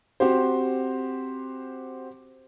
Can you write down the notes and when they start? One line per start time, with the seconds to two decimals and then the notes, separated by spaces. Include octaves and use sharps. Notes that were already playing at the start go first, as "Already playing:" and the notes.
0.20 C4 F#4 G4 C5